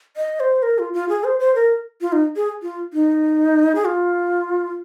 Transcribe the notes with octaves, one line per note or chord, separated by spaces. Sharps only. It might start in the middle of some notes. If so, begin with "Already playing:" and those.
D#5
C5
A#4
F4
F4
G#4
C5
C5
A#4
F4
D#4
G#4
F4
D#4
G#4
F4